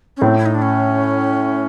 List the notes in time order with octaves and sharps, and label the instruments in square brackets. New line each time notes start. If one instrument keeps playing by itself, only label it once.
[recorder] C#4
[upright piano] A2 A3 [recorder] C4
[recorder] E4
D#4
D4
C#4